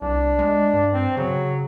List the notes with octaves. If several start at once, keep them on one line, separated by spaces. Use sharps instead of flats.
C2 D4
G#3
G2
C4
C#3 F#3